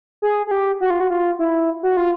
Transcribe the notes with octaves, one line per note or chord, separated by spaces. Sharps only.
G#4
G#4
G4
F#4
F4
F#4
F4
E4
F#4
F4